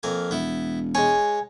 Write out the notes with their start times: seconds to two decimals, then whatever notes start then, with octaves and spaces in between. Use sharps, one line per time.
0.03 F2 A#3 G#5
0.31 E1 B3 E4
0.95 G#3 C#5 G#5